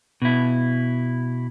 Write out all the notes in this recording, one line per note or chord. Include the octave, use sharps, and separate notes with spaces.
B2 E4